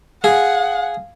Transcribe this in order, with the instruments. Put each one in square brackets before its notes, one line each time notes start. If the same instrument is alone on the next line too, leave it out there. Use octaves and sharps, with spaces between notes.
[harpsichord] G#4 [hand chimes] F5 [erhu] F#5